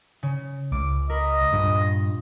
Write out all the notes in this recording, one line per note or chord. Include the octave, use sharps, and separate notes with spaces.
C#3
C#2 D6
A#4 D#5 B5
G2 A#2